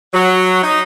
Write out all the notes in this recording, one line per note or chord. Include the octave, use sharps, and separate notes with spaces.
F#3
D#4